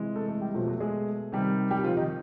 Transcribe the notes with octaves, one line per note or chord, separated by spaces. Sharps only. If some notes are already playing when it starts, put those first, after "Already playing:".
Already playing: C3 E3 G#3
A3 A4
A3 A4
G3 G4
B2 F3 F#3 A3 F4
F#3 F#4
G#3 G#4
C3 D#3 G3
G3 G4
F3 F4
D#3 D#4